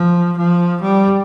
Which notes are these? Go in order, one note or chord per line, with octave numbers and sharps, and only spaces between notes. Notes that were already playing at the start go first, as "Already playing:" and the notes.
Already playing: F3
F3
G3